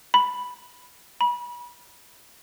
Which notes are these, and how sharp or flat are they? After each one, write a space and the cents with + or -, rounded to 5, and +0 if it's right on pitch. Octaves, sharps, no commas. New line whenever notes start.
B5 +0
B5 -30